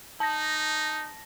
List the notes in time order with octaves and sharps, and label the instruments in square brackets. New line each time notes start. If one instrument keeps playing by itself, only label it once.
[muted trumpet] D#4 [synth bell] A5 A#6